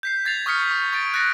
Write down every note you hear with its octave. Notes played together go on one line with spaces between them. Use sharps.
G6 B6 C7
G#6 A6 C7 F7
C#6 D#6 F6 B6 C#7
C#6
C#6 A6 D7
F#6 A6 A#6 C#7